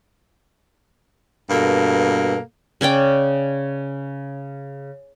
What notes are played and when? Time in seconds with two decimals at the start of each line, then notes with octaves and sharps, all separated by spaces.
1.50 G2 B2 A#3 A4
2.81 C#3 C#4 D5 G5